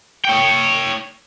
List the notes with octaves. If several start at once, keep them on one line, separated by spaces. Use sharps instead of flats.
C#5 G5